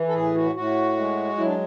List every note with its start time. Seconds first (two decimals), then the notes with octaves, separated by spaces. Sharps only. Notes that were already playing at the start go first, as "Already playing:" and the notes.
Already playing: E3
0.08 A4
0.14 A2 G#4
0.35 F#4
0.55 A2 F#4
0.97 G#3
1.37 F#3 E4
1.46 D4